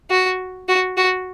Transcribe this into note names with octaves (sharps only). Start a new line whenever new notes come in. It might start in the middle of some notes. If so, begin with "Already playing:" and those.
F#4
F#4
F#4